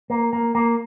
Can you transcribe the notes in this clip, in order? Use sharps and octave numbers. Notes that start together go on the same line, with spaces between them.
A#3
A#3
A#3